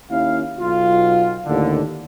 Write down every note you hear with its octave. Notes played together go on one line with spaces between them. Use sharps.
D#2 A#3 C#4 E4 F5
B1 F4
D#2 A2 D3